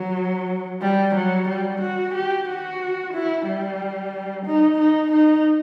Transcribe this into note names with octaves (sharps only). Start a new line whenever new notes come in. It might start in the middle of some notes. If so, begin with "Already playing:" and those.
Already playing: F#3
G3
F#3
G3
F#4
G4
F#4
E4
G3
D#4
D#4
D#4